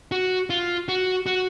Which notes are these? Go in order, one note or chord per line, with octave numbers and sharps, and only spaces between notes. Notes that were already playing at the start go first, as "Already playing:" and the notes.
F#4
F4
F#4
F#4